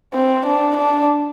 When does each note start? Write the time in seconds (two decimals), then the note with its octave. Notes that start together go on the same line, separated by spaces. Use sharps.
0.14 C4
0.46 D4
0.77 D4